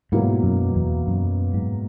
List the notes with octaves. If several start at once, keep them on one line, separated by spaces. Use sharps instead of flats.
G#2 B2 F#3 A#3 E4
F#2
E2
F#2
G#2